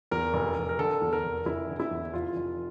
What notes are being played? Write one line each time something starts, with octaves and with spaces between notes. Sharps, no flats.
E2 A#4
F1
F1
A#4
D3 A4
E2
A#4
F1
F1 E4
D3
E4
E2
F1 F4
F1